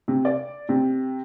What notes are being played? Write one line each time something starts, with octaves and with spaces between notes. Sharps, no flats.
C3
D5
C3